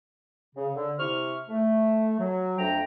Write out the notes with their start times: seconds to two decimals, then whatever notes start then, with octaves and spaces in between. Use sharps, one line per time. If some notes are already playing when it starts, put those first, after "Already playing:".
0.56 C#3
0.75 D3
0.98 C3 E4 C#6 F6
1.49 A3
2.19 F#3
2.58 F2 A3 D4 G5 A#5